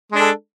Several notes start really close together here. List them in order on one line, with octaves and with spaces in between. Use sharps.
G#3 D4 A4